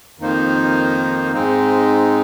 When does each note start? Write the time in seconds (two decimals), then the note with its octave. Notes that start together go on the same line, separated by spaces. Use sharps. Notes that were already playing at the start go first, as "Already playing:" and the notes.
0.18 F2 D#3 A#3 D#4 C5
1.33 G#2 G#3 C4 D#4